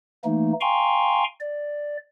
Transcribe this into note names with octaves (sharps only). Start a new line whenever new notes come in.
E3 A3 A#3 D#4
F5 G5 G#5 A#5 C6 C#6
D5